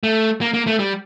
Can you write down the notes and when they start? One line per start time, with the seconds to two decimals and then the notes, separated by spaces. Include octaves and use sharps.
0.03 A3
0.41 A#3
0.54 A#3
0.67 A3
0.79 G3